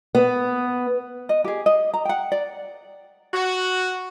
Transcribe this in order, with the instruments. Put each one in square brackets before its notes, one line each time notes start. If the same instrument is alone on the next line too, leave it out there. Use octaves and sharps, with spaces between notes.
[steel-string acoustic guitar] B3
[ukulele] D#5
G4 G#4
D#5
A#5
F#5 G5
D5
[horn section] F#4